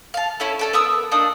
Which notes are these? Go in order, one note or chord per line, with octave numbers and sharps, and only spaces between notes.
F5 A5
C#4 E4 A4
C#4 A4 D5
B3 A#4 D#6 E6
A#3 D4 D#4 D#6